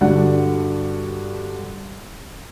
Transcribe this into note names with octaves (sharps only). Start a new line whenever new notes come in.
G2 D3 D4 F#4 F#5